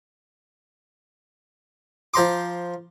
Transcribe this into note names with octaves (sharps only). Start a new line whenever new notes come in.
F3 C5 A#5 C6 D6